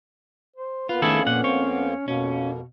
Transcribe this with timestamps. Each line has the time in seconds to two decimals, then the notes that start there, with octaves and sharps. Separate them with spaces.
0.56 C5
0.89 F2 A#3 B3 F4 B4
1.02 D#3 A3 C#4 E4 G#4 A4
1.27 A#2 F#5
1.44 C4 C#5
2.08 F2 B2 A#3 C#4